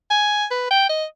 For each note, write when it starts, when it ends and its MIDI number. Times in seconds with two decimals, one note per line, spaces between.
0.11 0.46 80
0.51 0.70 71
0.71 0.88 79
0.89 1.05 75